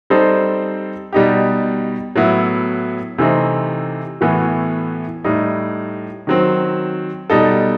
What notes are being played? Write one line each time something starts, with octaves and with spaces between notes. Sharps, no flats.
G3 C4 D#4 A4 C5
B2 G3 D#4 G4
A2 F#3 B3 E4
C3 E3 A3 C4 D#4
A2 E3 B3 F#4
A2 G3 D#4
D#3 F#3 C4
B2 G3 D#4 A4